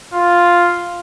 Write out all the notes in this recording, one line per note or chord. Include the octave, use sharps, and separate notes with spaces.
F4